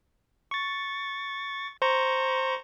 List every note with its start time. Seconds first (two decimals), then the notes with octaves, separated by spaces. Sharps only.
0.51 C#6 A6
1.82 C5 A#5 C#6